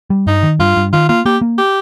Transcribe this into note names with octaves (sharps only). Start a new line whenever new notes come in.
G3
G2 D#4
D#3
G2 F4
G2
D#3 F4
A#3 F4
A#3 G4
A#3
G4